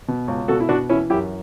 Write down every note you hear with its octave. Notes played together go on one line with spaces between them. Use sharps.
B2
C#2
B2 F#4 A4
E4
B2 D4 F#4
E3 C#4 E4
F#2 E4 G4